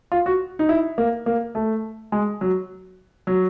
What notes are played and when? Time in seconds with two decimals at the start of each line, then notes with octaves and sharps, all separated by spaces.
0.12 F4
0.26 F#4
0.59 D#4
0.69 E4
0.98 A#3
1.26 A#3
1.55 A3
2.12 G#3
2.41 F#3
3.27 F#3